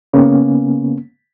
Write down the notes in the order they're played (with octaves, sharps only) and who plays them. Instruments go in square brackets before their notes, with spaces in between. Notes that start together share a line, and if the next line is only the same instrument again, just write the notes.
[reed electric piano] C#3 A#3 B3 C#4